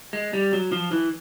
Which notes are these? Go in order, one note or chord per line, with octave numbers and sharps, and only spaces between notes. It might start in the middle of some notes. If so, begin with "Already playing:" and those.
G#3
G3
F#3
F3
E3